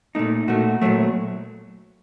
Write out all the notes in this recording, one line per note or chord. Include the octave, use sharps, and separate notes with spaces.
A#2 A3 D#4
A#2 A3 F#4
A#2 F#3 A3